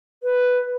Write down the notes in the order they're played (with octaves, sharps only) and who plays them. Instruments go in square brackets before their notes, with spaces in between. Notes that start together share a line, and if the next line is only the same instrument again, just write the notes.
[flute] B4